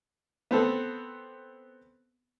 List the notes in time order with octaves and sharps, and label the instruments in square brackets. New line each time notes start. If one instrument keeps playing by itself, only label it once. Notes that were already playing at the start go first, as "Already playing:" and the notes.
[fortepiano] B3 C4 A4